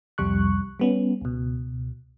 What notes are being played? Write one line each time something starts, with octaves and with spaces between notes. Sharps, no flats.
C2 F2 G3 C#6 F#6
G3 B3 C#4
C#2 B2